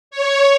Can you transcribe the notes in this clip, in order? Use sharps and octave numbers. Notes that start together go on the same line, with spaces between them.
C#5